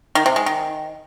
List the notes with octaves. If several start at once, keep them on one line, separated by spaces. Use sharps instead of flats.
D#3
C3
G#3
D#3